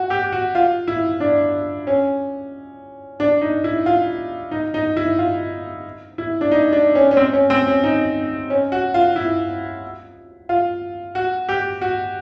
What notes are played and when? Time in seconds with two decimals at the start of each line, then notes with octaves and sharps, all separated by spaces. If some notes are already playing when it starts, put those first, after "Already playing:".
Already playing: F#4
0.10 G4
0.32 F#4
0.55 F4
0.88 E4
1.20 D4
1.87 C#4
3.20 D4
3.41 D#4
3.64 E4
3.86 F4
4.51 D#4
4.74 D#4
4.97 E4
5.19 F4
6.18 E4
6.41 D4
6.51 D#4
6.72 D4
6.95 C#4
7.11 C#4
7.17 C4
7.33 C#4
7.50 C4
7.67 C#4
7.84 D#4
8.50 C#4
8.72 F#4
8.94 F4
9.16 E4
10.49 F4
11.15 F#4
11.49 G4
11.81 F#4